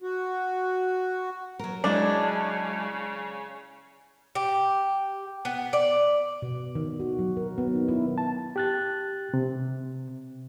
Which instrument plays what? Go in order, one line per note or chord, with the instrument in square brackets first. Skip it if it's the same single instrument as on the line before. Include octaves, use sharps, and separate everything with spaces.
[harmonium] F#4
[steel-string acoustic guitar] F#3 A#4
[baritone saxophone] C#3 [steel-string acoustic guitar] F#3 G#3 E4 [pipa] D4
[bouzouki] G4
B3
D5
[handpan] B2
D#3
F#4
F#3
A#4
B3
D#4
E4
[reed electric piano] A5
G4 F#6 A6
C3